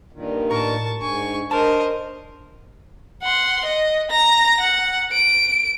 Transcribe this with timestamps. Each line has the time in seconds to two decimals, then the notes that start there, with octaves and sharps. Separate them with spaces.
0.13 G2 A#2 D#3
0.51 A2 A#4 A5 C#6
1.01 G#2 D4 G#5 C#6
1.51 D4 A#4 C5 D#5 A5
3.23 F#5 C6
3.65 D#5
4.11 A#5 A#6
4.60 F#5
5.12 D7